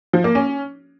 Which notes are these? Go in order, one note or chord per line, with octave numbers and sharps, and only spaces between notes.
F3
A#3
C#4